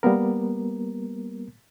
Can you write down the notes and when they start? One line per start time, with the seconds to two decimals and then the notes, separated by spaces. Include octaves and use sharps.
0.03 G3 A#3 B3 A#4